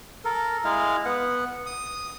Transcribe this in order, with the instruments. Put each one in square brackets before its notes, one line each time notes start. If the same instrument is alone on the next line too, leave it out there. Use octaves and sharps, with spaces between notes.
[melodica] A4 A#4
G#3 E4 F5
B3 F#5
D#6